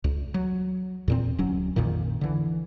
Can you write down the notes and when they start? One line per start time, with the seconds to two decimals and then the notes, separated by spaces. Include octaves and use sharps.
0.04 C#2
0.34 F#3
1.08 E2 A#2 C4
1.39 D1 F#3 C#4
1.76 A#1 F2 A#2 D#3
2.21 D3 E3